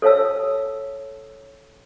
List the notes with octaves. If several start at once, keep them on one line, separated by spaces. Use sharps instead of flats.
A4 C#5 F5 A5 E6